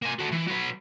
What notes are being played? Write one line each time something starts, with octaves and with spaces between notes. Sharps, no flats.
A#3 G#5
A3 F#4
E3
F#3 B4